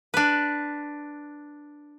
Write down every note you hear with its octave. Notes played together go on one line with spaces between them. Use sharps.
D4 B4